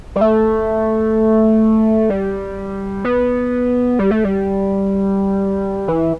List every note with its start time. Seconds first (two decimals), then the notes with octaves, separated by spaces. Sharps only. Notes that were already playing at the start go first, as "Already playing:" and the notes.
0.16 G3
0.21 A3
2.10 G3
3.05 B3
3.99 G3
4.11 A3
4.24 G3
5.88 E3